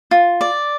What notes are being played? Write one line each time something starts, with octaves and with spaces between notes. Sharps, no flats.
F4
D5